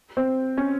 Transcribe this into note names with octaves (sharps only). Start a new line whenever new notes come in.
C4
C#4